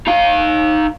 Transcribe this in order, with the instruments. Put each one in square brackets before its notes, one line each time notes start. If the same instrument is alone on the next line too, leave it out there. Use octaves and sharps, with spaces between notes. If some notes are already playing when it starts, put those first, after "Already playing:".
[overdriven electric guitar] D#4 F5